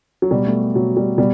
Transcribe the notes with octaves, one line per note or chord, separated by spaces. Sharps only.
F#3
B2 G3
A3
B2 F#3
G3
B2 G3